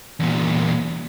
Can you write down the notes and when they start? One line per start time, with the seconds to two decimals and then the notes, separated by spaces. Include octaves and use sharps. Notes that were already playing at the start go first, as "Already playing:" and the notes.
0.20 E2 A#2